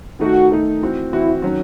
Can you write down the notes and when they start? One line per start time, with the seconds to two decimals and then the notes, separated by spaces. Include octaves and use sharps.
0.20 D#3 A3 D#4 F#4
0.51 D#3 A3 D#4
0.82 E3 C4 F#4
1.13 E3 C4 E4 F#4
1.42 D#3 F#3 C#4 F#4